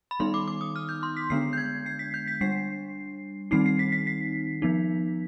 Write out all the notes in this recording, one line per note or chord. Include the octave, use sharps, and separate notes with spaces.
B5
D#3 G3 B3 D#4 C6
D6
D6
D#6
F6
G6
C6
B6
D3 G#3 B3 D4 C7
G6
G#6
C7
B6
G6
B6
G3 D4 C7
D#3 G3 C4 D#4 C7
C7
B6
B6
B6
F3 B3 D#4